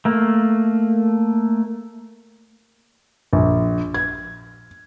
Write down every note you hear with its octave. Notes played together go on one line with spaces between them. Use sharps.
A3 A#3
A#1
G#6